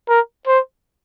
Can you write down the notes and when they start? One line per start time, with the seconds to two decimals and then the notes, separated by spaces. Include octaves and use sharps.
0.09 A#4
0.47 C5